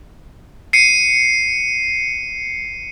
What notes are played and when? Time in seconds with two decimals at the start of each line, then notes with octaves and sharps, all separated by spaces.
0.73 C7 C#7 D#7